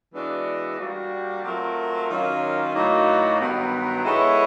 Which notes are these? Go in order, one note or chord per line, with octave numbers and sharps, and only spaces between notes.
E3 G#3 B3 D4 F#4
G3 A#3 D4 F#4
F#3 A3 C4 F4 A#4
D#3 F#3 A#3 C#4 F4
A2 F#3 A#3 D#4 F#4
G2 D#3 F#3 B3
G#3 B3 E4 A4 C#5